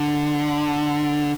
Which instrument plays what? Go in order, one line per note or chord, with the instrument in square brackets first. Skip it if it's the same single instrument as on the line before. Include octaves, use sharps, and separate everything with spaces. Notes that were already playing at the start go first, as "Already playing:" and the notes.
Already playing: [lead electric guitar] D3